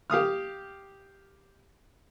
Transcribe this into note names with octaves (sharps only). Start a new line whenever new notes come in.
G4 F5 D#6 F6